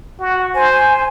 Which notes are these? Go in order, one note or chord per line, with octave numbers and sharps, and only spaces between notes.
F#4
C5 G#5